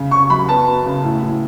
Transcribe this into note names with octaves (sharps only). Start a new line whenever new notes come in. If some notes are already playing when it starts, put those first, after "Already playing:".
Already playing: C#3
C#3 C#6
F#2 B5
B3 A5
B3
C#3
A2
A2